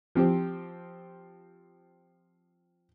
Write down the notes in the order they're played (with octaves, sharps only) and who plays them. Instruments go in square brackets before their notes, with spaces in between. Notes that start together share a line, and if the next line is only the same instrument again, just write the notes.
[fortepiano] F3 C4 G4